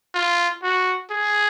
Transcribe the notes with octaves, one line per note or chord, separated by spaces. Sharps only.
F4
F#4
G#4